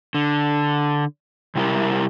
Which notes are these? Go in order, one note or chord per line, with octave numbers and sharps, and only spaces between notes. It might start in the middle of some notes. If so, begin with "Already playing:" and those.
D3
C3 G3 E4 G4 A#4